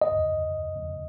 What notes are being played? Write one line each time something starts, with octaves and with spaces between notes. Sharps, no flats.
D#5